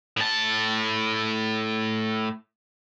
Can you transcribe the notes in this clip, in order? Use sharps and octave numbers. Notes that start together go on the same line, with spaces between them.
A2 A5